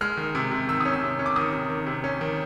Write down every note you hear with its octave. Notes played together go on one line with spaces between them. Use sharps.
G#3 F6
D#3
C3
C3
D#3 E6
C#4 D#6
E6
C3
C#4
D6
D#3 D#6
C3
D#3
C3
C#4
D#3